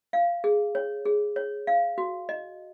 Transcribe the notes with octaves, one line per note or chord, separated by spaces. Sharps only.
F5
G#4
C#5
G#4
C#5
F5
F#4
D#5